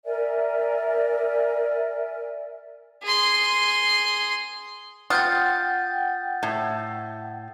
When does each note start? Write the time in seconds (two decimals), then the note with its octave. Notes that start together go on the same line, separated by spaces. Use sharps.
0.04 A#4 D5 E5 G#5
3.03 G#4 C6
5.10 F4 F#5 G5 D#6 G6 A6
6.43 A2